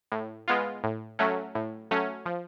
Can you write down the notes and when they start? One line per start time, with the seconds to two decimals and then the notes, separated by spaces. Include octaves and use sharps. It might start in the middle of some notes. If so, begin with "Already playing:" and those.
0.12 A2
0.48 G#3 B3 F4
0.84 A2
1.19 F#3 A3 C#4
1.55 A2
1.91 F#3 A3 C#4
2.26 F3